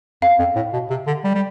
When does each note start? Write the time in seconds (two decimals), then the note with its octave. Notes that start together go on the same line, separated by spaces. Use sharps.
0.22 F2 F5
0.39 F2
0.56 A2
0.73 B2
0.90 C3
1.07 D3
1.24 G3
1.34 G3